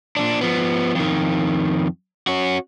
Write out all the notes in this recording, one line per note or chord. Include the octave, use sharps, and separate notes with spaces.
A#2 D4
F3 B3
F2 D#3
C#4 F#4